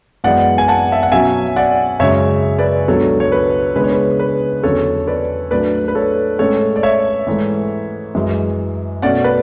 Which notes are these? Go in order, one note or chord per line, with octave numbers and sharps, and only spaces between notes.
F#2 E3 G#3 B3 D5 F#5
G#5
F#5 A5
E5
F#5
B2 F#3 C#4 E5 G#5
D5 F#5
F#2 C#3 G#3 C#4 C#5 E5
B4 D5
C#2 B2 F#3 B3 D4 A4 C#5
C#5
B4
C#3 G#3 B3 D4 B4
C#5
B4
B4
E2 D3 F#3 C#4 A4 C#5
B4 D5
A2 F#3 A3 D4 B4 D5
B4
A4 C#5
A2 G#3 C#4 A4 C#5
D5
C#5 E5
G#2 E3 A3
F#2 E3 G#3
B2 A3 C#4 D5 F#5
B4 D5